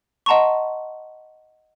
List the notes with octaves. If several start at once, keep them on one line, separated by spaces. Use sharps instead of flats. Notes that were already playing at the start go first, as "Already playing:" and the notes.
D#5 F#5 A5 A#5 C6 C#6